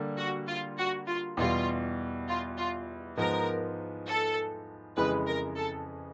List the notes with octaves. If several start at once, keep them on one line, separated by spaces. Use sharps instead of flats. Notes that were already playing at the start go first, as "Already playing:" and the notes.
Already playing: D3 G3 A#3
F#4
F4
F#4
F4
E2 B2 G3 F4
F4
F4
G#2 F3 G#3 B3 A#4
A4
F2 C#3 E3 G#3 B4
A#4
A4